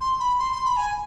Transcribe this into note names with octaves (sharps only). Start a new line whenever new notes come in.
C6
B5
C6
C6
B5
G#5